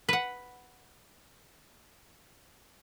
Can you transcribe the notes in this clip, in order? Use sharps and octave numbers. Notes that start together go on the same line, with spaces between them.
B4 F#5